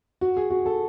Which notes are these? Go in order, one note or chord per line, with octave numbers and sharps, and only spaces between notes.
F#4
G#4
F#4
A4